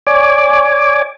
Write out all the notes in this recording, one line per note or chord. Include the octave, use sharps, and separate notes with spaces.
C#5 D5 G#5 D6